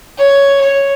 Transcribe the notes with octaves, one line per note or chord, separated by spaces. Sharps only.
C#5
C#5